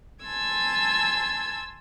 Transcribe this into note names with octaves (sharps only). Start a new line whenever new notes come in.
G#5 A5 C6 E6 G#6